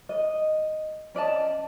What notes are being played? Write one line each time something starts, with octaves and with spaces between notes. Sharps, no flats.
D#5
C#4 D5 D#5 A5